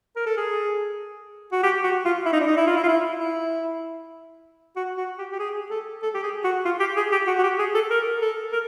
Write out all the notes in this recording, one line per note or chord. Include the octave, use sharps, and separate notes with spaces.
A#4
A4
G#4
F#4
G4
F#4
F4
E4
D#4
D4
D#4
E4
F4
E4
F4
E4
E4
F#4
F#4
G4
G4
G#4
A4
A4
G4
G#4
F#4
F4
G4
G#4
G4
F#4
F#4
G4
G#4
A4
A#4
A4
A#4